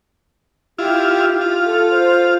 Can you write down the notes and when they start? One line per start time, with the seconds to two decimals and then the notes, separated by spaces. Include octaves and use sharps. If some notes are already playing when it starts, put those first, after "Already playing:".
0.78 E4 F4 G4
1.41 F4
1.66 A4
1.90 C5